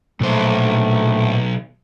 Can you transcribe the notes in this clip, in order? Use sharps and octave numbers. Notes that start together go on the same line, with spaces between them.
B1 A#2 A3 C5